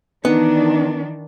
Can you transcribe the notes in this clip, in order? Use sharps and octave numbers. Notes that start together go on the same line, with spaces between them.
D#3 E3 B3 D4 D#4